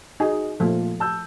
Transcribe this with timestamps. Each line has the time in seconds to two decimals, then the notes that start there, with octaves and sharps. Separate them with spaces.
0.20 D#4 F#4 G#4
0.60 A#2 F3 A3 F4
1.00 A5 E6 G6